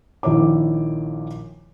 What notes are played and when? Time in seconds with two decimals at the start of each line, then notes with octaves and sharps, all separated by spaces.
0.23 A#1 D#3 E4 C#5 D6